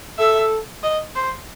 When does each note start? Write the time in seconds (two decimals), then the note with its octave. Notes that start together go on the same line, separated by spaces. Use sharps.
0.19 A4 E5
0.83 D#5
1.16 C5